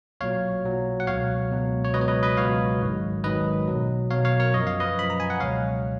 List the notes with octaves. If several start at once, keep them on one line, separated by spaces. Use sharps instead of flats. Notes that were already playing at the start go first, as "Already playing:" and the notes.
B1 A#2 F#3 C#5 F5
B1 A#2 F#3
F#5
C#2 B2 F#3 C#5 F5
C#2 B2 F#3
C#5
C#2 B2 F#3 B4 D#5
C#5
B4 D#5
B4 D#5
C#2 B2 F#3 C#5 F5
G#1 G#2 D#3 F#3
G#1 G#2 D#3 F#3 B4 D#5
B1 B2 F#3
B1 B2 F#3 C#5 F5
C#5 F5
A#4 C#5
F#2 F3 D#5
F5
B4 D#5
F#2 F3 B5
A#5
G#5
F#5
C#2 B2 F#3 C#5 F5